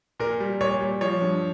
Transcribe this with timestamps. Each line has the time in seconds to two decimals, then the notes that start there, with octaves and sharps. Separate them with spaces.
0.20 A#2 A#4
0.40 G3
0.61 A#2 C#5
0.81 G3
1.01 F3 C#5
1.22 G2